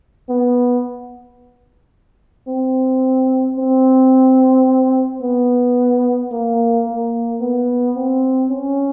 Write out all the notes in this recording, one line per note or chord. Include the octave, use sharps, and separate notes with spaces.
B3
C4
C4
B3
A#3
A#3
B3
C4
C#4